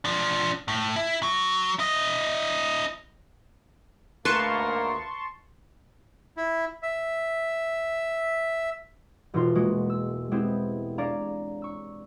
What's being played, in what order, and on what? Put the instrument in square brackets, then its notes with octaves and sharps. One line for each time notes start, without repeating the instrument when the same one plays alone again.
[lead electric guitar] F3 D4
A2
E4
F#3
E4 D#5
[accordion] D2 A#3 [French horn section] G#2 A#4 [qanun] B4 [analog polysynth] A5 C6 C#6
[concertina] E4
E5
[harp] E1 B2 D#4 F4 C6
G#3 A#3 F#4
E6
G#3 B3 C4 E4 G4
D4 C#5 D5 F5 A#5
C#6 E6